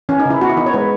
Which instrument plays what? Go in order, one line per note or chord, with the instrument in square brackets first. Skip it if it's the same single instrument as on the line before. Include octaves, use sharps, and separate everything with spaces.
[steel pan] E3 C#4
D#4
C#3 E4
B3 F#4
E4
E3 D#4
C#5
G#3 B4